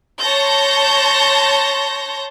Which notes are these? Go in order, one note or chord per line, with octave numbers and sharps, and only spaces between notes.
C#5 A5 C6 G6 A#6